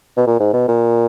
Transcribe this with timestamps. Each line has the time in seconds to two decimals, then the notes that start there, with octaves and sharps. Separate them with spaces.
0.17 B2
0.27 A#2
0.40 G#2
0.53 B2
0.68 A#2